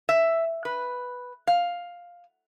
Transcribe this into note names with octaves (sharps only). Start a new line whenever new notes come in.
E5
B4
F5